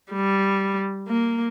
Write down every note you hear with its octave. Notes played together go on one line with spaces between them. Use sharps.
G3
A#3